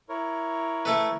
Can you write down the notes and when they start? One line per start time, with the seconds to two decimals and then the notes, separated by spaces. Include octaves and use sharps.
0.09 E4 A#4 C#5
0.85 A3 A4 B4